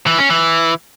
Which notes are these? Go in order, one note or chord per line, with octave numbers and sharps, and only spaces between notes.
E3
C#4
E3